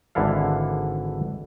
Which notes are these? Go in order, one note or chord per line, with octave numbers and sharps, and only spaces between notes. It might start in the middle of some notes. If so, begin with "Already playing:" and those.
G#1 D3 E3 E4 A4 F5